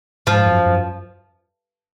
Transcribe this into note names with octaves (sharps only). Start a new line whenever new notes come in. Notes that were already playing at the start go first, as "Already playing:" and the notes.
G#2 F3
F#2
F#2